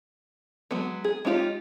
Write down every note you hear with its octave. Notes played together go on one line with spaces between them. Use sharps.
F#3 G#3 B3
G#4
G#3 C#4 D#4 F4 G4